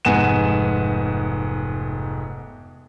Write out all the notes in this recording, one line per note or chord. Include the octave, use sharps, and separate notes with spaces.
F1 G#2 B3 G#5 E7